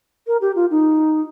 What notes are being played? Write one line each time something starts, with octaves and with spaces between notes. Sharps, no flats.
A#4
G4
F4
D#4